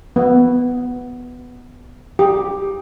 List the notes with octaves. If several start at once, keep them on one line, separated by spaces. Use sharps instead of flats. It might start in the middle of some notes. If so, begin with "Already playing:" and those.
B3
G4